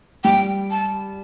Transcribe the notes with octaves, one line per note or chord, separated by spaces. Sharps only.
G3 G5
A5